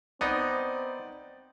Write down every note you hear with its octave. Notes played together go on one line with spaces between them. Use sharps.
B3 C4 D#4 D5 G6